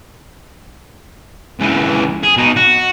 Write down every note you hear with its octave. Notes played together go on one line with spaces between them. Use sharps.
C#2 E3
G#4
B2 D#4
F#4